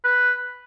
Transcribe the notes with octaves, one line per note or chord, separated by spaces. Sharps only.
B4